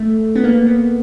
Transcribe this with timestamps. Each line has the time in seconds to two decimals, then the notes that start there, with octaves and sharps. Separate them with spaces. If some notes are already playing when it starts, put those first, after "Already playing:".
Already playing: A3
0.36 B3
0.44 A#3
0.67 B3